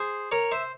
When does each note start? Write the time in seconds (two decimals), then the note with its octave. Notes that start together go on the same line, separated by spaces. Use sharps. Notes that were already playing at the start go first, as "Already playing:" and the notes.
Already playing: G#4 C5
0.32 A#4 C#5
0.52 C5 E5